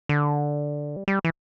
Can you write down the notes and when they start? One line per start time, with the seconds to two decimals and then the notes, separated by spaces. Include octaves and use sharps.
0.09 D3
0.96 G3
1.08 G3
1.25 E3